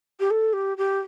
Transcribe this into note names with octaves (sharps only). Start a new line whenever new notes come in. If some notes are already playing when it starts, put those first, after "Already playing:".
G4
A4
G4
G4